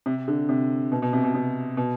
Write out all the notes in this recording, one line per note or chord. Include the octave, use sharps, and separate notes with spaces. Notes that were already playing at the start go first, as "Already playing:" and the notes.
C3
D3
C3
B2
B2
C3
B2
C3
B2